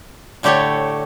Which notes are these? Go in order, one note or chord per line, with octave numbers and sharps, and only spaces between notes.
A2 D3 A3 G4 A4 C#5